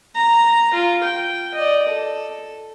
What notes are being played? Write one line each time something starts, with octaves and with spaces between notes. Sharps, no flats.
A#5
F4
G5
D5 D#5
A4